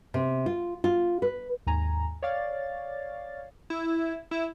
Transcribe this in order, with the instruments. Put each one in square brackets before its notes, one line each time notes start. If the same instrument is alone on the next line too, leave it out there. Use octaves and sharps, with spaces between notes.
[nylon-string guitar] C3
F4
F4
B4
[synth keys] D#2 G#2 G#5 A#5
C#5 D5 F5 A6
[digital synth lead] E4
E4